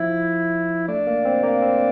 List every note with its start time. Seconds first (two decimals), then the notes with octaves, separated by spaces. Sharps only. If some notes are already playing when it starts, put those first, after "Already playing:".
Already playing: F3 E4
0.88 A3 D4
1.07 A#3
1.25 C4
1.43 A#3
1.62 C4